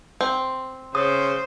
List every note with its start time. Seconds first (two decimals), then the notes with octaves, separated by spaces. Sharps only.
0.21 C4
0.95 C#3 C5 D#6